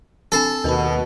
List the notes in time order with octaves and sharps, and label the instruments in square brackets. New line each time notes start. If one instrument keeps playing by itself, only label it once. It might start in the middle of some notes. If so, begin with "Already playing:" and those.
[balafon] C4 D4 G#5 [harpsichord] A4
[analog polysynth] D#2 [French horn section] B2 [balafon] A#4 A5 B5